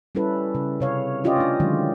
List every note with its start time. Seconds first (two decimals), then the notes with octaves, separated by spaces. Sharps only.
0.15 G3 C#4 E4 A4 B4
0.55 C#3
0.80 C3 C#5 F5
1.24 C#4 F4 G4 D5 D#5
1.37 A3 D4
1.60 D3 D#3 F#3 G#3